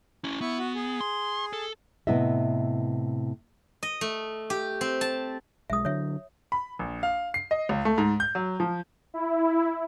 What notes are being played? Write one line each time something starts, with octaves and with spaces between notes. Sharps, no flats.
C#4 E4
B3 E4 C#6
F#4
G#4
C6
A4
A2 C3 B3 E4 D#5 E5
D#5
A3
G4
C4
A5
B1 G#3 E5 D#6
D3 F#3 C#5 E5
B5
A#1
F5
C7
D#5
C#2
A3
G#2
G6
F#3
F3
E4